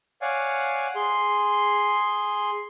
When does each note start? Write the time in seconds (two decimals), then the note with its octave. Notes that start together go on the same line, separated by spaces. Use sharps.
0.21 C#5 D5 F5 F#5 G#5
0.95 G#4 C6